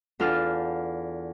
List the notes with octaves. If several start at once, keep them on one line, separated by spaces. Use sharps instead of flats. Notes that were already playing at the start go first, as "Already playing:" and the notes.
E2 D4 F4 A4 F6